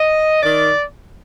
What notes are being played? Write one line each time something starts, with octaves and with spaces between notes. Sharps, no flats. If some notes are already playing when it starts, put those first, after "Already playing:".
Already playing: D#5
D#3 D5